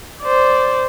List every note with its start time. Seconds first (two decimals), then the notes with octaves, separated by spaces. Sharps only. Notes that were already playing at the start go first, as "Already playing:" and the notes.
0.22 C5 D5